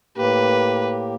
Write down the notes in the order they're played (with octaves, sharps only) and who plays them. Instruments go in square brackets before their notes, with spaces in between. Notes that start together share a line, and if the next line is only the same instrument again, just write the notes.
[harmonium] A2 A#3 G4 [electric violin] B4